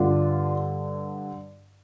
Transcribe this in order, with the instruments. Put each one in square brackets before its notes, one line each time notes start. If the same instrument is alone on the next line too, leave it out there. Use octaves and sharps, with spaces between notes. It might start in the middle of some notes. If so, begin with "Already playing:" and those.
Already playing: [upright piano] G2 D3 D4 F4